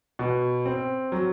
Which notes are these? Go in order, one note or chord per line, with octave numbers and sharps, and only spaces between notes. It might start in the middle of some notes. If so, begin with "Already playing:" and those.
B2
C4
F#3